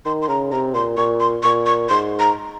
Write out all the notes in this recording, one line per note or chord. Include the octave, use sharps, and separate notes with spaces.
D#3 C6
C6
C#3 A#5
C3 A#5
A#2 C6
A#2 C#6
C6
A#2 C#6
C#6
G#2 C6
A#5